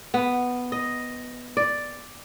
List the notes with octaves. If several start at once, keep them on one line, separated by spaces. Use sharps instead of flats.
B3
D#5
D5